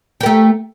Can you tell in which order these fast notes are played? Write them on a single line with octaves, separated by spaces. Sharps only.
G4 A#4 A3